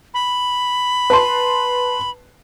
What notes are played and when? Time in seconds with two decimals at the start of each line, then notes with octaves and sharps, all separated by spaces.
0.14 B5
1.10 B4 A5 C6